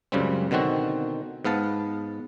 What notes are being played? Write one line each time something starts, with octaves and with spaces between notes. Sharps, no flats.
C#2 F#2 C#3 G3 C4
B2 D3 D#3 C4 F#4
G#2 B3 F5 A5